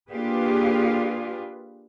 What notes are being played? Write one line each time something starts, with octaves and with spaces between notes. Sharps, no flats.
A#3 D4 F4 G4 G#4 B4